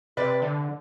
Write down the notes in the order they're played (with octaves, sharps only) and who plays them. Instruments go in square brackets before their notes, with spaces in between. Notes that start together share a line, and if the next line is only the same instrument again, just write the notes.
[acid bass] C3 [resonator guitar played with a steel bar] B4 D5
[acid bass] D3